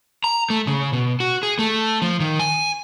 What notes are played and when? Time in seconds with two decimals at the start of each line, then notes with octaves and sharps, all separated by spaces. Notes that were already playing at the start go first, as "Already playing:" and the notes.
0.24 A#5
0.50 A3
0.67 C#3
0.93 B2
1.20 F#4
1.43 G#4
1.59 A3
2.02 F3
2.20 D#3
2.39 G#5